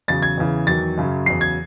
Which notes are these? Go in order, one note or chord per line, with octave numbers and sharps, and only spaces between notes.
E2 C#3 F#3 A6
G#6
E2 C#3 E3
E2 D#3 F#3 A6
F#2 C#3 F#3
E2 C#3 F#3 C7
G#6